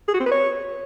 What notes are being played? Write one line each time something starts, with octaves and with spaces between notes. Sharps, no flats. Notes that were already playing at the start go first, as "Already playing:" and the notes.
G#4
F#4
C4
B4
C#5